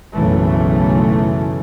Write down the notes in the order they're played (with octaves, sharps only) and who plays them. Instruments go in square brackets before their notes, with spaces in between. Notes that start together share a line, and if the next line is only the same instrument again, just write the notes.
[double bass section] F#1 B1 C#3 E3 A3